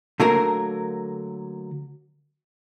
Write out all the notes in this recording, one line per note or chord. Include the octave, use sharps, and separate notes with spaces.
D3 F#3 A3 A#3 A#4